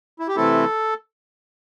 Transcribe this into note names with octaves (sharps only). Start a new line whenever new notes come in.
E4
G4
C3 E3 A3 C4 E4 A4